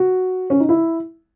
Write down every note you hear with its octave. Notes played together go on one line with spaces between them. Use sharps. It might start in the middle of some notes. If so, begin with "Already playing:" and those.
Already playing: F#4
C#4
D#4
E4